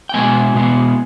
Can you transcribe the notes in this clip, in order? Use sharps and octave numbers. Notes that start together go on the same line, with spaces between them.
G5
B2 G#3 B3 G#5
B2 G#3 B3